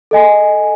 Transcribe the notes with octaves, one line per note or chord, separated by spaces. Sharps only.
A4 D#5 G#5